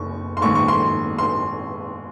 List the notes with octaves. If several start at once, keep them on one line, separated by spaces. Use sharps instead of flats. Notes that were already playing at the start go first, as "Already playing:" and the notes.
Already playing: F#1 C#6
C6
A#1 G#2 D#3 C#6
C#6
C6
C6